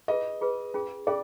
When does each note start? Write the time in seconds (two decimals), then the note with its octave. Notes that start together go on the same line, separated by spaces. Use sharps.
0.08 F4 G#4 B4 D#5
0.41 F4 G#4 B4
0.74 C#4 F4 G#4
1.07 C#4 F4 G#4 D5